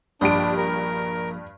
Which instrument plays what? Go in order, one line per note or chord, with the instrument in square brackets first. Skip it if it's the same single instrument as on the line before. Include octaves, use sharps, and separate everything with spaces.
[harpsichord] A#1 D#5 C6 [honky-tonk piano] G2 G4 D7 [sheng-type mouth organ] D4
[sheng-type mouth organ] A#4